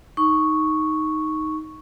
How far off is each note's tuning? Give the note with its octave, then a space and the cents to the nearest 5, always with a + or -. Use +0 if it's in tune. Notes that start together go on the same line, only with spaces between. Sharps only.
D#4 +5 C#6 +0